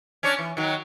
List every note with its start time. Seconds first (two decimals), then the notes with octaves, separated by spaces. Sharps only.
0.23 C#4 D4 C#5
0.39 E3
0.57 D#3 F#3